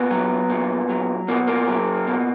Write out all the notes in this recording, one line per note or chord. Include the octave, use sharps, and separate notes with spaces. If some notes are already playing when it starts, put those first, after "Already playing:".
Already playing: A#2 B3
F#3
A#2
F#3
B2 A#3
A#3
F#3
B2